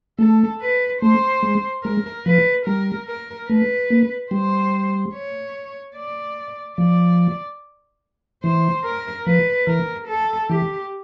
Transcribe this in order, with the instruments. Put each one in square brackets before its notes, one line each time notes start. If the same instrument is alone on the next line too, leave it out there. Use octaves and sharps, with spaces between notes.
[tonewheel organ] A3 [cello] A4
[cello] B4
[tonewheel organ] A3 [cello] C5
[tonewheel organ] G#3
[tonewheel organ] G#3 [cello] A#4
[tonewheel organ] F3 [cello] B4
[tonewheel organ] G3 [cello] A#4
[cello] A#4
[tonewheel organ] A3 [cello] B4
[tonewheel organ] A#3
[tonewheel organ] G3 [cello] C5
[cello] C#5
D5
[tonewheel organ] F3 [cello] D5
[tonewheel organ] E3 [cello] C5
[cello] A#4
[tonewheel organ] F3 [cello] B4
[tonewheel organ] E3 [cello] A#4
[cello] A4
[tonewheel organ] E3 [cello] G4